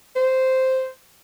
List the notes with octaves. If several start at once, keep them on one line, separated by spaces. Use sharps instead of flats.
C5